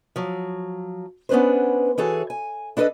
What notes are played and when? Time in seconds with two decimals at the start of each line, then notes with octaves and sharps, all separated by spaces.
0.16 F3 F#3
1.29 B3 C#4 D4 B4 C5
1.98 E3 F#4 G#4 A4 C#5
2.30 G#5
2.77 D4 E4 A4 B4 D#5